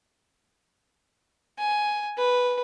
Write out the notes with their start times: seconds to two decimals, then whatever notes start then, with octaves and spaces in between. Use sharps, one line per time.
1.59 G#5
2.17 B4